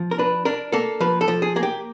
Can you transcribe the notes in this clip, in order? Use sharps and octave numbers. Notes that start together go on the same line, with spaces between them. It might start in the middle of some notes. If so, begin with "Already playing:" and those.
Already playing: F3
A#4
D4 B4
D4 A#4
A#3 A4
F3 B4
A4
F3
G#4
A#3 G#4
G4